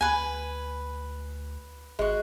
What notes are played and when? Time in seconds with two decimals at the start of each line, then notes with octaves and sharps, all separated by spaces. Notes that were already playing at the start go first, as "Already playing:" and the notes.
0.01 D2 B4 G#5
1.99 G#1 G#3 F#4